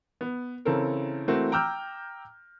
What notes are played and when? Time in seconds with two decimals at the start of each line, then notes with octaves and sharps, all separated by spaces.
0.21 B3
0.65 C#3 E3 C4 C#4 A4 A#4
1.28 E3 A3 A#3 C4 F#4
1.52 G5 A#5 D6 E6 F6 G6